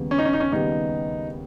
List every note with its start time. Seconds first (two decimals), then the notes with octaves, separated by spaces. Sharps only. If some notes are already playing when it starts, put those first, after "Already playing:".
Already playing: D#2 C#3 G3 B3
0.11 C#4
0.18 D#4
0.25 C#4
0.33 D#4
0.40 C#4
0.52 D#2 C#3 G3 B3 D#4